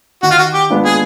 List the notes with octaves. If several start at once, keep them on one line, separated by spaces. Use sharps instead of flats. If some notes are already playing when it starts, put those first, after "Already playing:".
D#3 F#4
F4
F#4
G4
G#3 B3 D4 F4
G#4